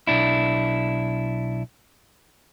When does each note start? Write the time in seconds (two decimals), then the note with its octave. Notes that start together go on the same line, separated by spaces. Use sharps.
0.07 B1 D4 E4